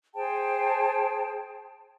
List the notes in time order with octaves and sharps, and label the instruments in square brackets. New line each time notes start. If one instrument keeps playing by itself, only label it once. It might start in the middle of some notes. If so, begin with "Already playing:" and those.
[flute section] G#4 C5 G5 A5